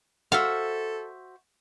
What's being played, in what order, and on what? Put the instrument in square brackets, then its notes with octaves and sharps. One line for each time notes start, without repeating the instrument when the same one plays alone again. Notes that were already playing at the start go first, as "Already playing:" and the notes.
[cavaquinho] F#4 C5 E5 [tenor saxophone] A4 [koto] F5